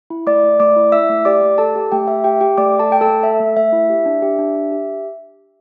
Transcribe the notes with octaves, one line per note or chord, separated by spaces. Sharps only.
E4
A3 D5 D6
A3
A3 D5 D6
E4
E4 E5 E6
A3
G4 D5 D6
A3
G4 A4 A5
G4
A3 G4 G5
A3 E5
G4 G5
G4 G5
A3 D5 D6
A3
A4 A5
A4 G5
A4 A5
A3
A4 E5
A3
A3 E5
E4
G4
D4
G4
D4
G4
G4